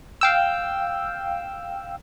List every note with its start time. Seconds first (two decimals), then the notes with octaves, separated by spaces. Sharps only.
0.21 F5 G5 E6